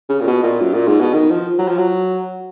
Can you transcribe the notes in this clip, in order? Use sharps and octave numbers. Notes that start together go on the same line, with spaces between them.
C#3
A#2
B2
A#2
F#2
A#2
G#2
B2
D#3
F3
F#3
F3
F#3